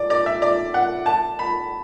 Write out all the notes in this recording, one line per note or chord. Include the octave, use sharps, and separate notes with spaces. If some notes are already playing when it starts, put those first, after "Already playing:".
Already playing: D5
D5
E5
D5
F#5
A5
B5